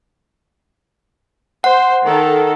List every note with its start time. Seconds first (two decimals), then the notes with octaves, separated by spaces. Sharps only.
1.64 C5 F#5
2.04 D#3 A4